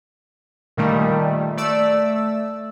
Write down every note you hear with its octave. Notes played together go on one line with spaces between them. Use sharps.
A#2 D#3 G3 A3
A3 D5 E6